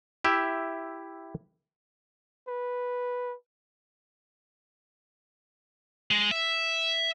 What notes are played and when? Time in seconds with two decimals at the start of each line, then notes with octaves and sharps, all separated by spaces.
0.24 E4 G4 E5
2.48 B4
6.11 G#3
6.31 E5